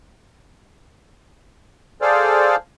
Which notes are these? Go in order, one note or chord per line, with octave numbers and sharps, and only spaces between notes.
G#4 A4 C5 D5 F5